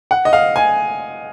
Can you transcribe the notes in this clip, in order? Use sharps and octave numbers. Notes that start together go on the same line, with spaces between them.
F#5
D#5
F5
G#5